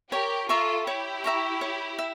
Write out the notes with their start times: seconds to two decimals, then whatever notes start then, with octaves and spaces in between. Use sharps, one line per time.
0.11 G4 A#4 C#5
0.49 F4 A4 E5 A#5 C#6
0.86 E4 G4 C#5
1.24 E5 A#5 C#6
1.61 C#5
1.98 E5